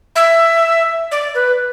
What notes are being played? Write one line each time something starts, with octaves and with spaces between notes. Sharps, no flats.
E5
D5
B4